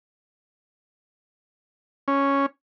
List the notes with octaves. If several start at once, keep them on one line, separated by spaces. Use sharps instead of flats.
C#4